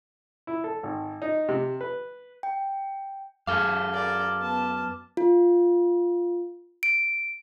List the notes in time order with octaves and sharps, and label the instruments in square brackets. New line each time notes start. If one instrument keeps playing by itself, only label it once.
[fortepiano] E4
A4
G#1
D#4
C3
B4
[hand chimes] G5
[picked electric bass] F#2 [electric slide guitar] G#4 A4 F5 [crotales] D6 F6
[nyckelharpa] A#4 D5
B3 A5
[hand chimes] F4
D7